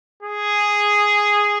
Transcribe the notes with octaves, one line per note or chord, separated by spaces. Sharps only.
G#4